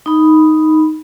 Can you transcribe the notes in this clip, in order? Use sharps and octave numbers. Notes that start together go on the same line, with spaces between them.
D#4 B5